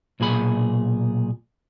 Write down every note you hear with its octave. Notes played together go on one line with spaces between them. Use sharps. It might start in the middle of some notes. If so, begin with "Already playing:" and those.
B1 A#2 G#4 B5